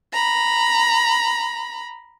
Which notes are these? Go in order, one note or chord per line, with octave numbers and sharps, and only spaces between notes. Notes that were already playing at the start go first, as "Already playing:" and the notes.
A#5 B5